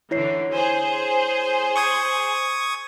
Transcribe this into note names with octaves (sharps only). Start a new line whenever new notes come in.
D3 E3 E4 C#5 C7
G#4 C5
C#6 D#6 G#6